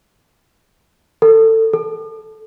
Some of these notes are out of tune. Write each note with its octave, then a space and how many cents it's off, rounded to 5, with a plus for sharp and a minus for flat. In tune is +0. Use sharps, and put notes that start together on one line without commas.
A4 +25
A4 -15